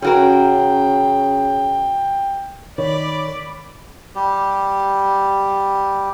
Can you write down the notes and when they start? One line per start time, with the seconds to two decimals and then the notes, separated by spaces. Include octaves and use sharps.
0.02 C#3 C#4 F#4 A#4 G5
2.78 D#3 C#5 D5 B5 D6
4.15 G3 G4